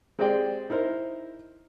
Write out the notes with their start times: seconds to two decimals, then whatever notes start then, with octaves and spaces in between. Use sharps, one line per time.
0.19 G#3 C4 G4 G#4 D5 G5
0.70 D#4 E4 A#4 C5